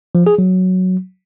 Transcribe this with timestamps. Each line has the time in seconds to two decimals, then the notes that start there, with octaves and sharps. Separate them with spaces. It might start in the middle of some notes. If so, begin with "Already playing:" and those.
0.15 F3
0.27 G#4
0.38 F#3